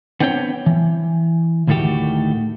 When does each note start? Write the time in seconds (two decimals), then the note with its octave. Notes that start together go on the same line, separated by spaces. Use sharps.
0.20 B3 C4 D4 C5 C#5 G5
0.66 E3
1.67 D2 A2 D#3 A3 F#4 G4